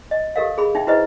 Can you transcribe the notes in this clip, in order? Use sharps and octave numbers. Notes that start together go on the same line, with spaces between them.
D#5
G4 A4 A#4 D#5 F5
G#4 B5
D#4 E5 G5
E4 F#4 G#4 B4 C5 D#5